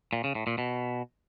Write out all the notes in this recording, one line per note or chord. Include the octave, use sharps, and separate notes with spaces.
A#2
C#3
A2
A#2
B2